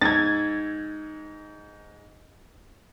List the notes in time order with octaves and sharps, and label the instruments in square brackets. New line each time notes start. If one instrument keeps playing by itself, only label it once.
[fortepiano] G#2 [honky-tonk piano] G#6 A6